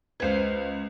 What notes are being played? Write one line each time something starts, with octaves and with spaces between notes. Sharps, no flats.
C#2 B4 C5 F5 G#6